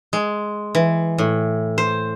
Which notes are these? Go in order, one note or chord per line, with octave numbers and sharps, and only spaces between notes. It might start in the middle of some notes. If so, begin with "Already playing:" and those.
G#3
E3
A2
C5